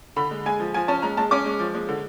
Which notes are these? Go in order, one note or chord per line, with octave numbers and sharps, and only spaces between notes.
D3 B5
G#3
G#3 G#5
F3
F3 G#5
C#4 A5
G#3 A#5
G#3 A5
C#4 D6
G#3
F3
G#3
D3